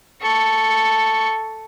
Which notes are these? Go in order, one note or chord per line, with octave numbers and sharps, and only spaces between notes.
A4 C#6